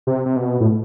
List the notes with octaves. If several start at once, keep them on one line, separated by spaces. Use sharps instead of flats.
C3
C3
B2
A2